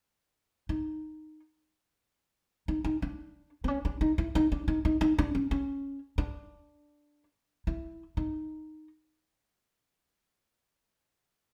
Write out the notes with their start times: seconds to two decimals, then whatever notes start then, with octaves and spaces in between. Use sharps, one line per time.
0.69 D#4
2.68 D#4
2.84 D#4
3.02 D4
3.64 C4
3.68 C#4
3.85 D4
4.01 D#4
4.18 E4
4.35 D#4
4.52 D4
4.68 D#4
4.85 D#4
5.01 D#4
5.18 D4
5.35 C#4
5.51 C#4
6.18 D4
7.67 E4
8.17 D#4